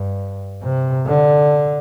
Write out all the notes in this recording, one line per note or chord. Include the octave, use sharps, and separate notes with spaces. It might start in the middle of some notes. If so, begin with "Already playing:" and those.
Already playing: G2
C3
D3